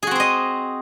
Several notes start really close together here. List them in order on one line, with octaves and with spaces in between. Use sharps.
G#4 F#4 C4 C5 D#5